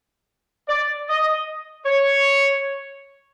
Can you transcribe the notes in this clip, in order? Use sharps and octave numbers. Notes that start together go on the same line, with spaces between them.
D5
D#5
C#5